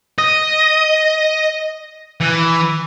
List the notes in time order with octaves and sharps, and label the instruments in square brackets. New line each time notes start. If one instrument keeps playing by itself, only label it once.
[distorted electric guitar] D#5
E3